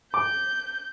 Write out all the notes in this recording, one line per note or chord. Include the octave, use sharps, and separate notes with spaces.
D6 G6